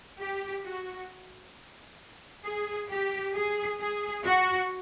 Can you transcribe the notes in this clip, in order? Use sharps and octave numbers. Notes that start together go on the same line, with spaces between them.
G4
F#4
G#4
G4
G#4
G#4
F#4